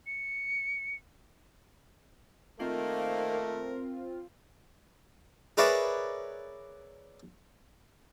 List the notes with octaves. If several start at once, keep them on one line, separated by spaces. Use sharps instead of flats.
C#7
D#3 A3 A#3 C4 F4 A#4
G#4 A#4 B4 C#5 D5 E5